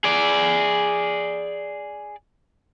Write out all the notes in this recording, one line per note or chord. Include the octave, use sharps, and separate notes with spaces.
G#4 D5